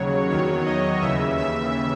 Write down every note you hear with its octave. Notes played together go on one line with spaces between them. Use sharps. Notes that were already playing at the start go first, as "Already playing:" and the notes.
Already playing: D#2 C#3 F#3 C#5
E2 D#3 F#3 C#5
D#5
D#2 C#3 E3 E5
E5